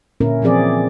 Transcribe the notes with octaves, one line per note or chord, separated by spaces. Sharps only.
A#2 D3 C#4 E4 A#4
E3 F3 C4 G#4 D5